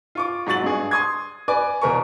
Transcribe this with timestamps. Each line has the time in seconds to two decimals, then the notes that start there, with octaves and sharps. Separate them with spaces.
0.15 F4 C#6 D6
0.46 G#2 F#3 C#6 A6 F#7
0.63 G2 G#4
0.91 C6 D#6 G#6
1.48 B4 D5 G#5 D6
1.81 E2 B2 A#4 A#5 C#6